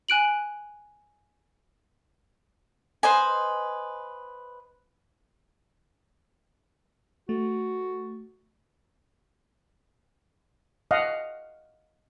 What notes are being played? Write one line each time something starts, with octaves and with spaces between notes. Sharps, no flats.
G#5 F#6 D7 F#7
B4 C5 D#5 G#5
A3 F#4
D#5 F5 F#5